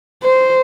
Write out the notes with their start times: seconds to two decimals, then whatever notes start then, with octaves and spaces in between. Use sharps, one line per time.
0.23 C5